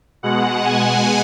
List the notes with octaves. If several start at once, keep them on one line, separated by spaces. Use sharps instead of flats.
B2 G#3 F#5
G#5